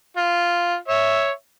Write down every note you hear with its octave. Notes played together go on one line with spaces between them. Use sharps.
F4
C#5 E5